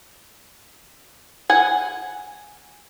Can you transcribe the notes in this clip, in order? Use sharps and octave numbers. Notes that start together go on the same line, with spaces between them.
F#5 G#5